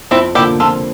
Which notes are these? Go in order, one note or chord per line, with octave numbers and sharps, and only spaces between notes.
F2 C4 E4
D3 F3 A#3 E4 G4
F2 F4 A4